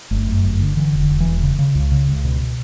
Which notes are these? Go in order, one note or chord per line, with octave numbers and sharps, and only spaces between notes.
G1 A3
F#2
G1
D3
D3 E3
E1
D3
E1
E3
E1
C#3
C#3
C#2
C#3
C#2
B2
B2